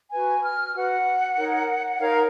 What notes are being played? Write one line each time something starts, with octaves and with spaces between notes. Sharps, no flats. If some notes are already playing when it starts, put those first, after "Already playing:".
F#4 B4 G#5
F6
F#4 B4 F#5
D#4 A#4 C#5
D#4 A#4 C#5 F5